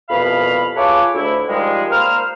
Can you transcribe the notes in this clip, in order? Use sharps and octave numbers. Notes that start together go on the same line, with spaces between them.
C2 F2 B2 F5 B5
F4 G#4 A4 B4 C#5 D6
D2 E4
D#3 F3 G3 G#3
A#3 C5 B5 F6